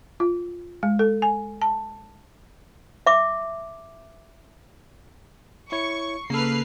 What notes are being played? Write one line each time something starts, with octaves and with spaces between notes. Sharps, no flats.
F4
G#3
A4
G#5
A5
E5 D6
E4 C#5 C#6
C#3 A#3 A4 B4 F6 C7